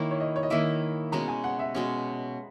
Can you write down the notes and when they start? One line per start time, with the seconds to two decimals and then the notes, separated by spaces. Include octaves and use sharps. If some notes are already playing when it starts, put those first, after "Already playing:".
Already playing: D#3 A#3 E4 C#5
0.11 C#5
0.20 D#5
0.36 C#5
0.43 D#5
0.50 D#3 A#3 E4 E5
1.12 B2 G#3 C#4 A#5
1.28 G#5
1.44 F#5
1.59 E5
1.75 B2 G#3 C#4